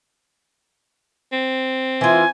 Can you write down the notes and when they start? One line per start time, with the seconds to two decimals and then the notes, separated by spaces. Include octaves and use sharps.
1.33 C4
2.01 E3 F4 G#5